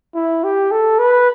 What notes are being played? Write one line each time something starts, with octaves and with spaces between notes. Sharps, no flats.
E4
G4
A4
B4